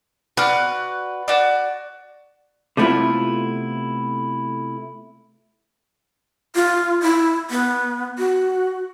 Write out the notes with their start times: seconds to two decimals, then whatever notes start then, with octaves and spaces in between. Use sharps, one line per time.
0.37 F#4 B4 D5 F6
1.28 F#4 D5
2.77 C3 A3 B3 E4 F4
6.55 F4
7.03 E4
7.50 B3
8.18 F#4